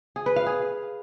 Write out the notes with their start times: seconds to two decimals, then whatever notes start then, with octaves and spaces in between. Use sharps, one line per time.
0.16 G#4
0.26 B4
0.36 F5
0.47 G#4